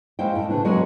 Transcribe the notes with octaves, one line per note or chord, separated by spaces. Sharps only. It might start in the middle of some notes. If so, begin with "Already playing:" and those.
G#3 C#4 E4 C5 F5 G5
A2
C#3 E3 D4 B4
F#3 G#3 B3 F#4 B4 C#5